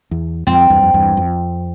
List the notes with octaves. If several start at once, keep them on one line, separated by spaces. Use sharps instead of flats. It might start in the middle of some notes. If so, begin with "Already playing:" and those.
E2
F2 C4
E2 G2
F2
E2 G2
F2